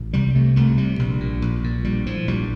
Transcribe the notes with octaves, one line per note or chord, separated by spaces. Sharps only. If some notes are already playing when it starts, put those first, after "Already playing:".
Already playing: A1
C2 G3
C3 A3
C2 A3
C3 G3
A#1
A#2
A#1
A#2
A#1 G3
A2 F3
A#1 G3